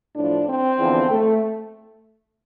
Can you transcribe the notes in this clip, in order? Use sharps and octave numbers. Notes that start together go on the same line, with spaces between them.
A2 F3 D4
C4
E2 D3 F3
A3